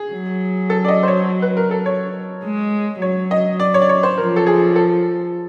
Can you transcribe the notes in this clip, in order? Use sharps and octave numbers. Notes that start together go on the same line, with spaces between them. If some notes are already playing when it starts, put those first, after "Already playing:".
Already playing: G#4
F#3
A4
D5
D#5
C5
C#5
B4
A#4
A4
C#5
G#3
F#3 C#5
D#5
D5
C#5
D5
C#5
C5
F3 A#4
A4
G#4
A4